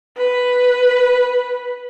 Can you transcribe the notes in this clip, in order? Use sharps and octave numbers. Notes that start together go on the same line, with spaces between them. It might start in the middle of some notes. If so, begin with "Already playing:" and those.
B4